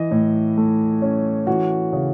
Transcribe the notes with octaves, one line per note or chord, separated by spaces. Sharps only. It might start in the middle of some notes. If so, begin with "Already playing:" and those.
Already playing: E3 D#5
A2
A3
C#4
E3 F#4
C#3